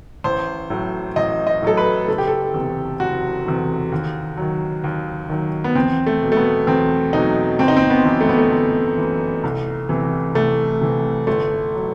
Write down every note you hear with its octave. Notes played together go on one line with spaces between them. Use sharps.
A1 C5
A2 F#3
A1 D#5
D#5
A2 F#3 A4
B4
F#1 A4
G4
A4
E2 C3
F#1 F#4
E2 C3
D#2
D#3 F#3
D#2
D#3 F#3
B3
E2 C4
A3
B2 F#3
A3
B3
E2 C4
B2 F#3 D#4
G1 C4
D#4
C4
B3
F#2 E3
A3
B3
A3
G1
F#2 E3
C2
C3 E3
C2 A3
C3 E3
G1 A3
F#3